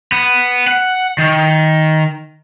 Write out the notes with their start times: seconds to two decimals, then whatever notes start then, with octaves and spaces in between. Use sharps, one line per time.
0.12 B3
0.67 F#5
1.18 D#3